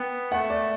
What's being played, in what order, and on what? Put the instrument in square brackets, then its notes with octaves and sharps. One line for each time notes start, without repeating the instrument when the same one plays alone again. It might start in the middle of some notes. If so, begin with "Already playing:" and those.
Already playing: [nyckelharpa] B3 [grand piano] G5
[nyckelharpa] A3 [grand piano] F#5
[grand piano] D5